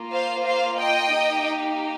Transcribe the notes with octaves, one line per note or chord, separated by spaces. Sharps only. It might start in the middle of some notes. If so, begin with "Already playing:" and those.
Already playing: A#3 F4
C5 F5
C5 F5
D#5 G5
A#3 D#4 G4